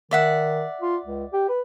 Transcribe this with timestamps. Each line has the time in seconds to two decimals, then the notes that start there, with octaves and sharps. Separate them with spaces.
0.11 D#3 D5 E5 F#5
0.81 F4
1.05 C#2
1.33 G4
1.49 B4